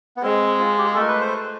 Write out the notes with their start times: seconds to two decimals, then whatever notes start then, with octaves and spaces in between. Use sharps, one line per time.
0.17 B3
0.23 G#3 C4
0.60 F4
0.78 G4
0.87 G#4
0.94 A4
0.97 A3 A#4
1.08 B4
1.21 C5